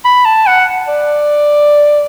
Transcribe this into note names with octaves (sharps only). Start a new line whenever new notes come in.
B5
A5
F#5
D5